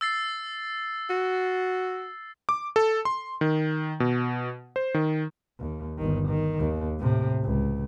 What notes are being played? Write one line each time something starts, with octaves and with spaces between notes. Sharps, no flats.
E6 A6 C7
F#4
D6
A4
C6
D#3
B2
C5
D#3
D#2
G1 D#3
D#3
D#2
A2 C3
C#2